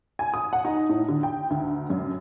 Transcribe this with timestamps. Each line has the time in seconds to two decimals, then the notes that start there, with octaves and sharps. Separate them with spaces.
0.19 G#5
0.34 D#6
0.53 F#5
0.65 D#4
0.89 A2
1.09 D3
1.23 G5
1.50 D2
1.90 F#2